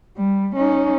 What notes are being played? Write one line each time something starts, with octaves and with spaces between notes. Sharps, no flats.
G3
C#4 D#4